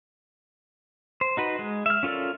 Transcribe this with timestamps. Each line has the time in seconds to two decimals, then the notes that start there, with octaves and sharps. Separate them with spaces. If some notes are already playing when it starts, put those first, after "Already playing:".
1.21 C5
1.37 D#4 F#4 B4
1.59 G#3
1.86 E5 F6
2.03 C#4 F4 A4 A#4 D5